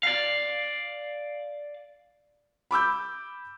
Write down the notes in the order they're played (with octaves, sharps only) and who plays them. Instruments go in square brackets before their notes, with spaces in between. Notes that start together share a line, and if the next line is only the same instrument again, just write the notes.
[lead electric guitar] D5 F5
[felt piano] B5 D6 E6 G6